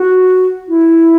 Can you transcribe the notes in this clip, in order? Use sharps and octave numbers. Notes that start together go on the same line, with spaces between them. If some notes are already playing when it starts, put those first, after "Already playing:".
Already playing: F#4
E4